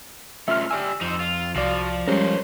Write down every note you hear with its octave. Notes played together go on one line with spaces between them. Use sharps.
A3 C#4 F4 E5 F6
G4 D5 G#5 E6
F2 D#4 C5
F4
C2 F3 F#4 D5 F5
G3 G#3 C#4 A#4 C5 C#5